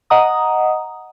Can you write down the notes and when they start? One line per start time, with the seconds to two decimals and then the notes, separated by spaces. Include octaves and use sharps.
0.10 D#5 F#5 A#5 D#6